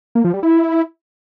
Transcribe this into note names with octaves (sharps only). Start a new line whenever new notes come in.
A#3
F3
G3
E4